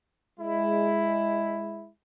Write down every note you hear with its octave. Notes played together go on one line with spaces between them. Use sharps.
G#3 E4